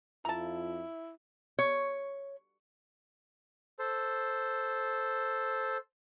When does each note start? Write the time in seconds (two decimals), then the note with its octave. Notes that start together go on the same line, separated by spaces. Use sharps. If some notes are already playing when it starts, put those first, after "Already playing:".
0.25 F2 E4 F4 A5 A#5
1.59 C#5
3.79 A4 C5